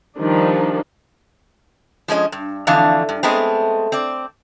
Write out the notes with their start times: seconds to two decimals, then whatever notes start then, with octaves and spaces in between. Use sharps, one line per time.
0.18 D#3 F3 G3 D4 D#4
2.08 F3 G#3 C#4 D#5
2.32 G2
2.67 F2 D3 E3 A3 D4 F5
3.09 G2
3.23 G#3 A3 B3 C4
3.92 C4 D5